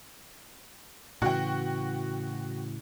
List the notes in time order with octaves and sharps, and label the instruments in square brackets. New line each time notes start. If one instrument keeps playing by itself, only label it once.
[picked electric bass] A2 C#3 E3 [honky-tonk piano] F#4 G5